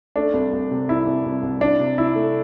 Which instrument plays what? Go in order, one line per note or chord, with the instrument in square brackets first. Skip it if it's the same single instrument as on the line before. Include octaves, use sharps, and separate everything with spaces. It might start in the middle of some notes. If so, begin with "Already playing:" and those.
[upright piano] A3 [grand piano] D4
[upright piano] C2
C2
C3
[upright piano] C2 [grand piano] E4
[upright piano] C2
C2
C2
[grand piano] D4 [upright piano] E4
[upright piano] C3
[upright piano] C3 [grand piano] E4
[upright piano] A3